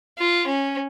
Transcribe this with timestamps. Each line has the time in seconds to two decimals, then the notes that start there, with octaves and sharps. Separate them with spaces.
0.19 F4
0.47 C#4